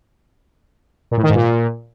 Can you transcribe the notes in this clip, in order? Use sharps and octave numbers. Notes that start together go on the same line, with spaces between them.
A#2
A2
D#3
G#2
A#2